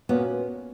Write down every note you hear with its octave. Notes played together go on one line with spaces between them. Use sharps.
A#2 A#3 B3 C#4 F#4